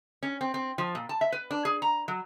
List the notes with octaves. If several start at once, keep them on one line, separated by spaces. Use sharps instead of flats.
C#4
C4
C4
F3
A#2
A5
E5
B4
D4
G#4
A#5
F#3